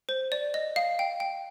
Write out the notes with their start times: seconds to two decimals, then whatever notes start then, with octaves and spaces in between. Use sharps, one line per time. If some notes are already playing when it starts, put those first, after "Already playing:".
0.09 C5
0.32 D5
0.54 D#5
0.76 F5
0.99 G5
1.20 G5